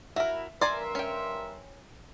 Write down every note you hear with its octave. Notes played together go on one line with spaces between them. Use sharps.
E4 F#4 A#4 E5
G2 A#4 D5 E5 G#5 A#5 C6
C#4 G5